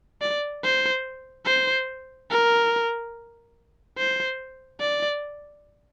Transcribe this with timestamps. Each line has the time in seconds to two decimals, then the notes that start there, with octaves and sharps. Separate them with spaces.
0.21 D5
0.63 C5
1.46 C5
2.31 A#4
3.98 C5
4.81 D5